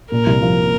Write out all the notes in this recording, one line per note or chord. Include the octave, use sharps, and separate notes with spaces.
A#2 A#4
C2
F3